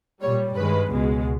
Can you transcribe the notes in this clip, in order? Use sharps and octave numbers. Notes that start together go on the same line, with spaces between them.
A#2 G3 C#5
G2 D#3 G#3 B4
C#2 B2 G#3